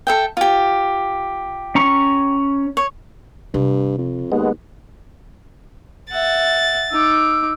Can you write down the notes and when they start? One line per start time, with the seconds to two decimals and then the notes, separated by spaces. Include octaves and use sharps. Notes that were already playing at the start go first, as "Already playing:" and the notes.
0.07 A4 E5 G5
0.37 F4 G4
1.75 C#4 A#5 C#6
2.77 C#5
3.54 G2 C3
3.98 F2
4.32 D#2 G#3 B3
6.12 E5 F#5 A6
6.91 D#4 D6 E6